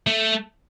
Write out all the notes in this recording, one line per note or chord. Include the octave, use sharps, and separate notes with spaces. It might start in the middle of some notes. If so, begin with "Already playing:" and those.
A3